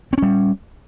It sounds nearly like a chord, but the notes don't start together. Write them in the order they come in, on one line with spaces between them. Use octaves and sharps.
C4 C#4 G3